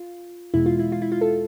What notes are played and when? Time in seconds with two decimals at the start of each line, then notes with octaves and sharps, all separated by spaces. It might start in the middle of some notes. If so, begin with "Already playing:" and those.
Already playing: F4
0.54 E2 B2 G#3 E4
0.66 F4
0.79 E4
0.92 F4
1.02 E4
1.12 F4
1.21 A4